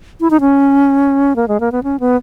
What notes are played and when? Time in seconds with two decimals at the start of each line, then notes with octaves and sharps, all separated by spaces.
0.20 E4
0.30 D#4
0.40 C#4
1.36 A#3
1.48 G#3
1.60 A#3
1.72 B3
1.83 C#4
2.00 B3